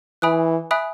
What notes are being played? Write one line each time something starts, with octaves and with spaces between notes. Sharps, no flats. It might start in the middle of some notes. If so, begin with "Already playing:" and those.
E3 E5 G#5 B5 D#6 F#6
E5 G#5 B5 D#6 F#6